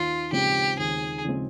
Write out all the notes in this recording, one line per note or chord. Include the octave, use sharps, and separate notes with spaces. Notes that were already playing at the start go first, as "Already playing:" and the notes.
Already playing: D#2 F4
C#3 F3 G#3 C4 G4
D#2 G#4
C#3 F3 G#3 C4